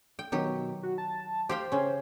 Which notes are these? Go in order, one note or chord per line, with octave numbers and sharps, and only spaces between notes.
G5
B2 D#3 F#3 G4
F#4
A5
G4 C5 F5 G5
C#3 C#4